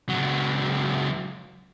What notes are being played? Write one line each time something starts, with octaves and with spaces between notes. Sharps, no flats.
C#2 F#3